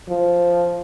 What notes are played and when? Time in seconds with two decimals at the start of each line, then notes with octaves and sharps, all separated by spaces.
0.09 F3